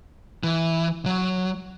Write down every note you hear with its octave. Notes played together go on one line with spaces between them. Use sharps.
E3
F#3